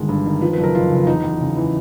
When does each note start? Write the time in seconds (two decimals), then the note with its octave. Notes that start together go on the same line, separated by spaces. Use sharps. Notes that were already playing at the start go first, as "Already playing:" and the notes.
Already playing: G1 D#3 G#3
0.09 G2
0.26 D#3
0.41 F3 B4
0.53 B4
0.58 F#1
0.63 A#4
0.74 F2 F4
0.92 C#3
1.07 E2 D#4
1.24 E2
1.41 C#3
1.57 E3